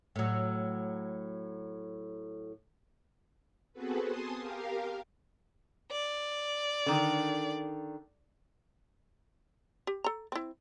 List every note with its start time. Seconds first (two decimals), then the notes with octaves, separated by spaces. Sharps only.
0.16 A2 F#3
3.73 B3 C4 F#4 G#4 A4 B4
4.03 G#5 A5 C6 D#6
4.37 G4 A#4 F5
5.91 D5
6.86 D3 D#3
9.87 G4
10.04 A4 A#5
10.32 C4 E4